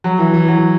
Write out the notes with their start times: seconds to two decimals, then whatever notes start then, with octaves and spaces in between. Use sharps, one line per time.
0.04 F#3
0.19 E3
0.33 E3
0.48 F#3